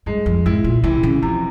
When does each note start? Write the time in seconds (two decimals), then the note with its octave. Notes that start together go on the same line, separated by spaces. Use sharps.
0.06 G2 G#3
0.26 F2
0.46 G#2 E4
0.64 A#2
0.84 C3 E3
1.03 C#3
1.22 C3 F3